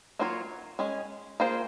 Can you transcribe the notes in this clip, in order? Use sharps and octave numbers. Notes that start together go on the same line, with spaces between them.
F#3 A#3 F4 A#4 C#5
G#3 C#4 G#4
A#3 F4 G#4 C5